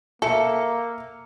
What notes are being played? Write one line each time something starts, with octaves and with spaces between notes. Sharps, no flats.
A#3 A4 E5 C#7